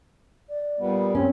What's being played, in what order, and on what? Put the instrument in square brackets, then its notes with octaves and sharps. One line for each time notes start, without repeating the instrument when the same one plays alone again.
[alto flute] D5
[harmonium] A#2 G3 B3
[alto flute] C4 [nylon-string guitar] C#4